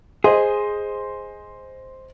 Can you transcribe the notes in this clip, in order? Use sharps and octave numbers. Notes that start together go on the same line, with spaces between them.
G#4 C5 D#5